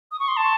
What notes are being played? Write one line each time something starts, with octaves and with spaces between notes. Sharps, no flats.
D#6
C#6
C6
A5